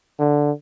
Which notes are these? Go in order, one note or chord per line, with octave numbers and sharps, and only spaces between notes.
D3